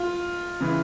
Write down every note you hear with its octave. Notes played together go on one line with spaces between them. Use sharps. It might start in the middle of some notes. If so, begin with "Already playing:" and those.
Already playing: F4
C#3 E3